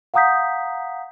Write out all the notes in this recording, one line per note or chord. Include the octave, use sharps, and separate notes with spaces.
F5 F#5 A#5 D#6 G6 B6